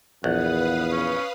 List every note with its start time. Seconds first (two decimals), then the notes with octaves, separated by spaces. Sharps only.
0.24 A#1 E2 B4 F5 F#5 D#6
0.91 C#4